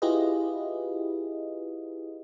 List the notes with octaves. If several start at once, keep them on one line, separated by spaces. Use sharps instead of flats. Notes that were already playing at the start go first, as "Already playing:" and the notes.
E4 F4 G4 G#4 B4 D#5